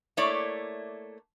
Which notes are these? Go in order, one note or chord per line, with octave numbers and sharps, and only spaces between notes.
A3 A#3 E4 C#5 D5